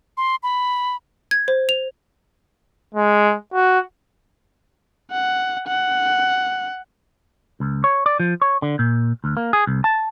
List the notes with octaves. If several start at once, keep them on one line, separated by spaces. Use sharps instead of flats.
C6
B5
G#6
C5
F7
G#3
F#4
F#5
F#5
C#2
C#5
D5
F3
C#5
D3
A#2
D2
A#3
G#4
C2
A5